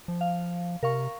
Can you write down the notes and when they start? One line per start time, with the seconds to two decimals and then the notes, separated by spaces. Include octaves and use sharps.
0.08 F3
0.21 F5
0.83 C3 A#4 F5 C#6